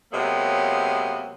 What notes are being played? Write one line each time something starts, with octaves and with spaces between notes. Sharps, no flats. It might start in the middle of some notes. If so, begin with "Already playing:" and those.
C3 F#3 G#3 A#3 B3